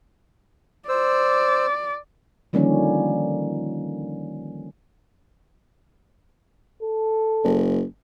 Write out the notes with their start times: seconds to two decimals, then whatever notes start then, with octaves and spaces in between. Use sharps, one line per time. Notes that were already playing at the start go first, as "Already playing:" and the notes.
0.89 C5 D5 E6
2.53 D3 D#3 F3 G3 A#3 C#4
6.82 A4
7.44 F#1